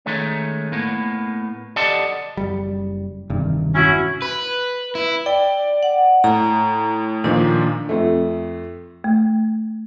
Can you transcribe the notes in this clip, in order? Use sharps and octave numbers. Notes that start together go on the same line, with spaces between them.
D#3 G#3 A3 C#4
A2 A#3 B3
G4 A4 D5 D#5 F#5 A5
F#1 D#2 G3
E1 G2 C3 D#3
C#4 E4 F#4
B4
E4
D5 G5
F#5
A2 A#5
A#2 D#3 F3 D4
F2 A3
A3